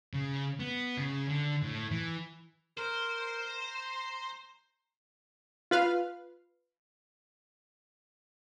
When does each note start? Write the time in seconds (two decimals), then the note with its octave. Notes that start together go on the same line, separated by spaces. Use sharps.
0.13 C#3
0.60 B3
0.98 C#3
1.29 D3
1.62 A2
1.91 E3
2.78 A#4 C5
3.47 A#5
5.71 F4 B4 F5